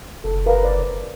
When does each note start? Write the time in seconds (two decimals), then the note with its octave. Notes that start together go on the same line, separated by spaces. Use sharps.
0.24 F#1 A4
0.46 A#4 B4 F5
0.62 C5 D5